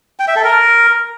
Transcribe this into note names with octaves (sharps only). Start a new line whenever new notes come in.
G5
E5
A4
A#4